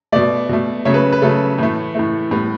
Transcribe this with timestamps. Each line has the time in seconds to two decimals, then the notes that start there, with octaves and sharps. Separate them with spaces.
0.12 B2 A3 D5
0.49 B2 A3
0.85 C#3 F#3 A3 C#5
0.94 B4
1.12 B4
1.22 C#3 F#3 A3 A4
1.58 A2 E3 A3
1.95 A2 E3 A3
2.31 A2 G3 B3 B4